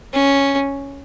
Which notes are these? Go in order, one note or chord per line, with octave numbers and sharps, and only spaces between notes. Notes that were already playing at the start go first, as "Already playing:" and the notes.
C#4